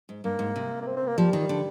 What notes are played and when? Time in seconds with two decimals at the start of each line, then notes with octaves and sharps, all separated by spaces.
0.09 G#2
0.24 G2 A#3
0.39 G#2
0.56 C3
0.81 A#3
0.86 C4
0.96 C4
1.07 A#3
1.18 F3 G3
1.33 D#3
1.49 D3